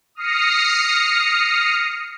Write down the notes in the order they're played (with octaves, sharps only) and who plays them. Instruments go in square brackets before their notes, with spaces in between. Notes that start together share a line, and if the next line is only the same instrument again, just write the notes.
[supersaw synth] D#6 F6 A#6 C7 C#7